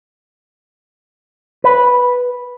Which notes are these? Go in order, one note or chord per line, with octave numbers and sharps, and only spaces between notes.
B4